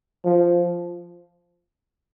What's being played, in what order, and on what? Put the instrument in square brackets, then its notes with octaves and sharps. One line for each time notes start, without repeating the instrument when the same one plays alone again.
[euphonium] F3